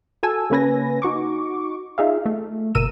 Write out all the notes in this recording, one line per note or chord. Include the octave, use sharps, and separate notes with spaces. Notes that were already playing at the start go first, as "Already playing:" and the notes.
F#4 A4 G#5 A5 E6
C#3 A#3 C#4 B4 G#5 A#6
D#4 F#4 C#6 D6
D#4 F4 G#4 E5 F5
A3
G1 B2 A#4 E6 D#7 E7